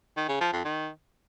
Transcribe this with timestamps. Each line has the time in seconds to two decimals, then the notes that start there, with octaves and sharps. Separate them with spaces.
0.17 D#3
0.29 C#3
0.41 F3
0.53 F2
0.65 D#3